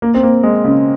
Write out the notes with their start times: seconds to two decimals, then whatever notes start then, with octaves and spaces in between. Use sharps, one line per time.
0.02 A#3
0.14 C4
0.23 A#3
0.43 G#3
0.64 C#3